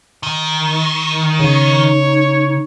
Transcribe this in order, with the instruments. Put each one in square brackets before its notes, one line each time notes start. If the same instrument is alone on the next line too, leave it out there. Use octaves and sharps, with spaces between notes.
[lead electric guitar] D#3
[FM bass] C#3 [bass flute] D#4 [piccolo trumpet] C#5